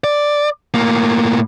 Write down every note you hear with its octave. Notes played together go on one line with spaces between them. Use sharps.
D5
A2 A#3